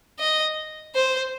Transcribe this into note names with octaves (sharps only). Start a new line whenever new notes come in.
D#5
C5